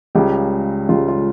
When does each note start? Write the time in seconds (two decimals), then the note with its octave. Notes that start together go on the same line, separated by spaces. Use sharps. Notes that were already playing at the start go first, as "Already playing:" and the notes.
0.15 C#2 C#3 G3 G4
0.89 C#2 C#3 G3 F4
1.08 F4